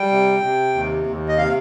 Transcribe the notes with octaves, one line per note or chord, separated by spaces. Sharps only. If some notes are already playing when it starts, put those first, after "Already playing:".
Already playing: G3 G5
C3
C3
D#2
D#2
D#5
C3 F5